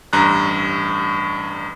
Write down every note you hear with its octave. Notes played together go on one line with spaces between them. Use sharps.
A1 G2 A#5 F#6